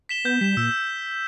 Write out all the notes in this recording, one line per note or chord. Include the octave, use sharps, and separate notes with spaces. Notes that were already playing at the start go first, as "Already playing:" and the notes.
B6 E7 G7
B3 G6
G3 B6 E7
A#2 E6